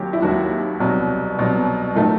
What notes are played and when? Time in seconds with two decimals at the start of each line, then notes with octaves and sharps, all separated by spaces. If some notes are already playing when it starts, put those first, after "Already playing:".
Already playing: D#2 D#3 F#3 G4
0.13 E4
0.22 D#2 D#3 F#3 F#4
0.80 C2 B2 F#3
1.38 C2 B2 F#3
1.95 D#3 F#3 A3